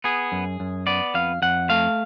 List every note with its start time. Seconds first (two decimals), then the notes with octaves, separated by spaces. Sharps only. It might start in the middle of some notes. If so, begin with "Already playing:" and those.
0.04 B3 G#4
0.32 F#2
0.60 F#2
0.87 B3 D5
1.14 F2 F5
1.42 F2 F#5
1.70 A3 F5